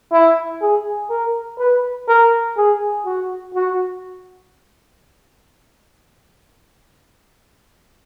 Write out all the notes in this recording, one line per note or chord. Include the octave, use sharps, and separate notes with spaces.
E4
G#4
A#4
B4
A#4
G#4
F#4
F#4